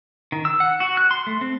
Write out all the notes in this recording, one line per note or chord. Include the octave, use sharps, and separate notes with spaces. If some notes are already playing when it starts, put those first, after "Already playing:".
D#3
E6
F#5
F#4
F#6
C6
A3
C4